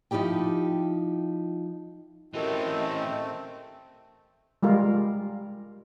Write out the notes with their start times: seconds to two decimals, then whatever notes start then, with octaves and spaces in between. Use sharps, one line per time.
0.11 F3 D#4 E4 G4 G5
2.34 E3 A3 C4 C#4 F#4 G4 A#4 D#5
4.63 G3 G#3 F4 A#4